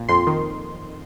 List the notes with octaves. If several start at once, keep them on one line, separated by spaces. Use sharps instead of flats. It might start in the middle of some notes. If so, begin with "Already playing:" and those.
Already playing: A#2
F2 C6
D#3